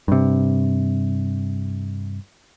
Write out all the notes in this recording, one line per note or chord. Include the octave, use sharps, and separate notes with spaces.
G2 C3